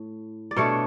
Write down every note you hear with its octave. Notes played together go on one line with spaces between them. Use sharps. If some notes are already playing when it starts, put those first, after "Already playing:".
Already playing: A2
D5
B2 A3 D4 C#5